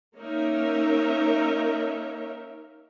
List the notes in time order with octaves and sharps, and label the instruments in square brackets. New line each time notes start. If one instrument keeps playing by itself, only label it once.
[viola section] A#3 C#4 D#4 A#4 C#5 E5